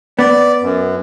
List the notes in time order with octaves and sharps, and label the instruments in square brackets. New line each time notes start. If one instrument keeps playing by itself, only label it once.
[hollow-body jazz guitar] B3 [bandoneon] D5
[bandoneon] F#2